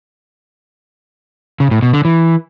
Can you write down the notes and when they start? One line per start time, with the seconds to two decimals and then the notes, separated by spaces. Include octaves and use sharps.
1.60 C#3
1.71 A2
1.82 B2
1.94 D3
2.05 E3